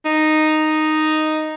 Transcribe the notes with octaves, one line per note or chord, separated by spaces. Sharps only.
D#4